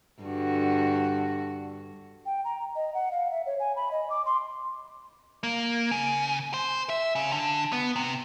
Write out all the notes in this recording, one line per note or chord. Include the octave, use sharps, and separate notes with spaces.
G2 D3 F#4
G5
A#5
D#5
F#5
F5
E5
C#5
G#5
B5
D#5
D6
C6
A#3
C#3
C5
E5
C#3
D3
B3
C3